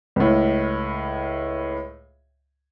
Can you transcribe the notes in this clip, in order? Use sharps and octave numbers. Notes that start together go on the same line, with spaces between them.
C#2 A2